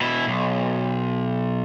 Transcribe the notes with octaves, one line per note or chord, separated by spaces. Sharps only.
B2 E4
B1